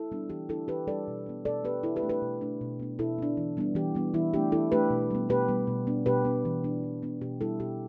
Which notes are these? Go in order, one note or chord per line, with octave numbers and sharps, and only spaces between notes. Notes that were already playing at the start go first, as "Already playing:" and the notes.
Already playing: E4 A4
G3 B3 D4
E3 G4
G3 D4 E4 A4
E3 G4 B4
G3 D4 A4 D5
B2
B3 D4
B2 A4 D5
B3 D4 G4 B4
B2 E4 A4
G4 B4
A3 D4
G4 B4
B2
A3 D4
B2
B3 D4
B2 E4 A4
B3 D4
E3
G3 B3 D4
E3 G4
G3 B3 D4
E3 E4
A3 D4 G4
E3 E4 A4
A3 D4 G4 B4
B2
G3 B3
B2 G4 B4
G3 B3
B2
B3 D4
B2 G4 B4
B3 D4
E3
B3 D4
E3
B3 D4
B2 G4
G3 D4 E4 A4
B2 G4